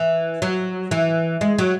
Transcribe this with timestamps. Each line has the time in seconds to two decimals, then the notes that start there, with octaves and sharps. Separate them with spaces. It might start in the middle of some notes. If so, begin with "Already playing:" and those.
Already playing: E3
0.42 F#3
0.91 E3
1.41 G#3
1.58 F#3